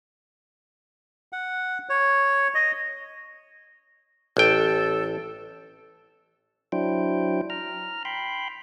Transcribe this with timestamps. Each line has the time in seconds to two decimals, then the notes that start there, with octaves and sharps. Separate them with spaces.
1.33 F#5
1.89 C#5
2.55 D#5
4.37 A1 A4 G5
6.72 F#3 D4 E4 C5 G5
7.50 A#5 F6
8.05 G5 B5 C6